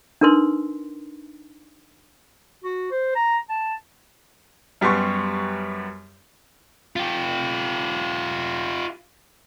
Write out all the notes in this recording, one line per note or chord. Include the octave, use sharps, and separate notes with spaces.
D4 D#4 A#4 B4 C6
F#4
C5
A#5
A5
F#2 G3 B3 G4 C6 C#6
F4 G4